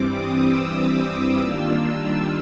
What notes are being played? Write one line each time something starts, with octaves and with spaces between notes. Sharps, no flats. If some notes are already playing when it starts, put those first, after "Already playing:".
Already playing: G2 E3 G3 C4 D6
D#6
E6
D#3 G3 A#3 D4 F4
E6